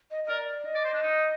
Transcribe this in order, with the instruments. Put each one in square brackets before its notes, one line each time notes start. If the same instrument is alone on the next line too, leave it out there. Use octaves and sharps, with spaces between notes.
[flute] D#5
D#5
[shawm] A#4 [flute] D5
[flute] D#5
[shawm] D5
C5
D4
D#4